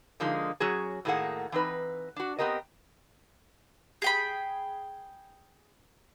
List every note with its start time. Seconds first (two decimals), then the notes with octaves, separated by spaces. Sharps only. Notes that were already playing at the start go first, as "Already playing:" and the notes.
0.20 D3 F3 G#3 A#3 D#4
0.60 F#3 C#4 F#4 G#4
1.05 A2 D#3 A3 A#3 G#4 F#5
1.52 E3 C4 D#4 B4
2.16 D4 F#4
2.39 B3 C4 G4 A#4 D#5
4.02 G#4 G5 B5